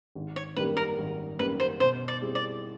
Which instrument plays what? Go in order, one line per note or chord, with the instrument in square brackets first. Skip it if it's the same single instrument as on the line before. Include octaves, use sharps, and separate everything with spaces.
[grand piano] G#1
[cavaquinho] C#5
[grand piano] F#2 D#3 G3 A#3 [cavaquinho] B4
[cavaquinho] A#4
[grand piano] G#1
[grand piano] F#2 D#3 G3 A#3 [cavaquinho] B4
[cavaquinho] C5
[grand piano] B2 [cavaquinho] C5
[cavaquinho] D5
[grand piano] G3 C4 E4 G#4
[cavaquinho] D5